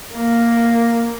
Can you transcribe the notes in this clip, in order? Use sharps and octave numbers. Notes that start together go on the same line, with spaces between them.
A#3